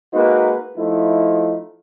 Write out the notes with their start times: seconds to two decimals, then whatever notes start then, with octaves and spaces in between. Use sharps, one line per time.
0.14 G#3 A#3 D#4 F#4 B4
0.78 F3 A3 D#4 E4